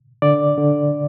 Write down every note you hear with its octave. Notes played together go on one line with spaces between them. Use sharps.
D3 D5
D3